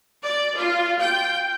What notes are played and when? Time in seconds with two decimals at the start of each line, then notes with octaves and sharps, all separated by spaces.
0.24 D5
0.57 F4
1.01 G5